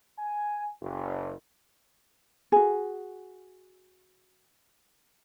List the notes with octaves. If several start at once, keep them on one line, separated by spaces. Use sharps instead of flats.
G#5
F#1
F#4 G#4